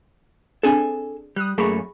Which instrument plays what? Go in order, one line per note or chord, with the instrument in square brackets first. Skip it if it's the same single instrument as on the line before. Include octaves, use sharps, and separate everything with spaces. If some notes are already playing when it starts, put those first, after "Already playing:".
[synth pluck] C4 D4 G#4 [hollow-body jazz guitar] A4 G#5
[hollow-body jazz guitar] G3 [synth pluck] D#6 F#6
[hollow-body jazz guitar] F#2 A3 A#3 [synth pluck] G#4 B5 C#6